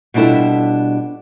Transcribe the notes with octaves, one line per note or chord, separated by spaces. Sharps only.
B2 G3 D4 E4 F4 A4